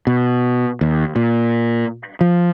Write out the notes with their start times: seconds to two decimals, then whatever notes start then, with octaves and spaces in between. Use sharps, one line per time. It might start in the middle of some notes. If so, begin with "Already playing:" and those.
0.07 B2
0.81 D#2
1.16 A#2
2.21 F3